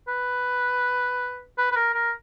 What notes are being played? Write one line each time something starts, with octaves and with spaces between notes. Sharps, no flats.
B4
B4
B4
A#4
A#4